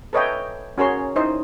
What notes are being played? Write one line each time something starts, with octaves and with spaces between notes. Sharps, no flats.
A4 B4 C#5 D#5 E5 G5
C#4 F#4 G#4 A#4 C#5 C6
D#4 E4 C5 D#5